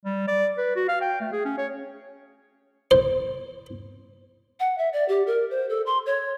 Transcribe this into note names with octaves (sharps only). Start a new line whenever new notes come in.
G3
D5
B4
F#4
F5
G5
A3
G#4
C#4
C#5
C5
F#5
E5
D5
G4
A#4
C5
A4
C6
C#5